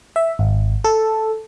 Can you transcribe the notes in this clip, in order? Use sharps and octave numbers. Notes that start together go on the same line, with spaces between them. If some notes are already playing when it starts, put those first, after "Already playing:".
E5
G#1
A4